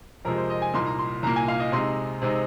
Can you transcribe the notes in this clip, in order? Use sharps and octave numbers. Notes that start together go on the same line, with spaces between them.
F2 C3 F3 G#3 A#4
C5
D#5
G#5
C2 A#2 A#3 D#4 C6
A#5
C6
C2 A#2 A#3 A#5
G#5
F5
D#5
C3 G#3 C4 D#4 C6
C3 G#3 C4 D#4